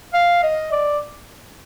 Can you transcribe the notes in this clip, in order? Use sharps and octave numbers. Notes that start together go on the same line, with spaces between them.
F5
D#5
D5